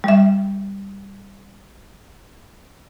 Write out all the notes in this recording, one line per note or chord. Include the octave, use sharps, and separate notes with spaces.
G3 E5